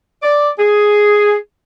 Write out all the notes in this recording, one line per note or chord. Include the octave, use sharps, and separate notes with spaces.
D5
G#4